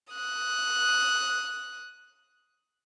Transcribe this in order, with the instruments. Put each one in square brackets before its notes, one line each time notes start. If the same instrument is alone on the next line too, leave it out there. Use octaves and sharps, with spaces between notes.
[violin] D#6 F#6